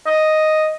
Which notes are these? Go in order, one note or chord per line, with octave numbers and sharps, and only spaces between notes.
D#5